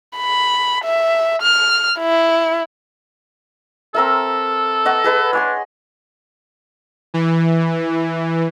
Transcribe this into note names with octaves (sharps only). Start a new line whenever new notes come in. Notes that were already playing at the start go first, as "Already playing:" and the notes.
B5
E5
F6
E4
C4 A4 A#4 E5
D#5 F#5 C#6
G#4 B4 D#5
D4 C#5 G#5 C6
E3